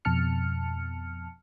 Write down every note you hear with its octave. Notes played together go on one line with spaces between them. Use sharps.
F2 B2 A5 F6 C#7